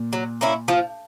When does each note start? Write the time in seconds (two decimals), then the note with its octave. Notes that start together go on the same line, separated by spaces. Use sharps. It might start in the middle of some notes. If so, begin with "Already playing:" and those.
Already playing: A#2
0.13 F#3
0.41 A#3 C#4 E4
0.68 F3